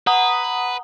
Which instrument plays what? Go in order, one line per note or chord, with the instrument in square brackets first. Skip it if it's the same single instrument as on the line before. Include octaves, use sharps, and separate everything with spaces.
[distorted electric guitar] B4 [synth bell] F#5 A#5 D#6